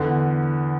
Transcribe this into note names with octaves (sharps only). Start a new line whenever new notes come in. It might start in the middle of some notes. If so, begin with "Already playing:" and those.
Already playing: E2 D3